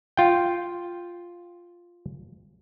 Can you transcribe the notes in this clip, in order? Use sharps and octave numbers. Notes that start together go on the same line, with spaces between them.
F4 G5